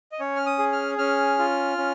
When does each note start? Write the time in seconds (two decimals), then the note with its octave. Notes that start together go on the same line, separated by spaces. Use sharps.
0.12 D#5
0.20 C#4 C#5
0.36 F6
0.46 D#6
0.59 G#4
0.72 F6
0.98 C#4 F6
1.39 F4
1.78 C#4